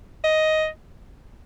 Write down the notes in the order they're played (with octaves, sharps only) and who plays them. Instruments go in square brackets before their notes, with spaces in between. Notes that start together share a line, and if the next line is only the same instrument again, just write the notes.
[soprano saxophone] D#5